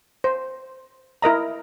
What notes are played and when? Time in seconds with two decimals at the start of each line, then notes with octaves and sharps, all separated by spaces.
0.24 C5
1.22 E4 A#4 D#5 A#5